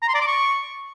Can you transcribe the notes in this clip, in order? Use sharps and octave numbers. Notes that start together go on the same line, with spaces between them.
A#5
C6
D5
D6
C#6